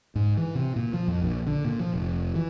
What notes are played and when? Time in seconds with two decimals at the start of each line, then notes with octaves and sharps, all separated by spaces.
0.15 G#2
0.37 E3
0.55 C3
0.76 A#2
0.93 F3
1.08 F2
1.22 A#1
1.47 D3
1.65 A#2
1.80 F3
1.93 F1
2.35 E3